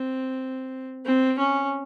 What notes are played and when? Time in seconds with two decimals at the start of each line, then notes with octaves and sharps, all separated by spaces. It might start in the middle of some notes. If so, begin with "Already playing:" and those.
Already playing: C4
1.05 C4
1.38 C#4